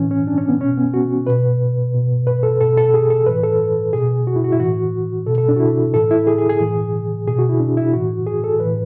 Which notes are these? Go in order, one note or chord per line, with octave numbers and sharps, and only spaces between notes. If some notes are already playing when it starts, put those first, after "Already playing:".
Already playing: A2 E3 C#4
C#4
D4
C#4
B3
B2 C#4
B3
F#4
B2 B4
B2
B4
A4
B2 A4
A4
G#4
A4
A2 E3 B4
A4
B2 G#4
F#4
E4
F#4
E4
A2 E3 F#4
B2 A4
A4
D4
F#4
E4
A2 E3 A4
E4
G#4
G#4
G#4
A2 E3
B2 G#4
F#4
E4
D4
E4
A2 E3 F#4
G#4
A4
A2 E3 B4